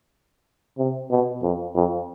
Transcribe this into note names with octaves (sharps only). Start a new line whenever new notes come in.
C3
B2
F2
F2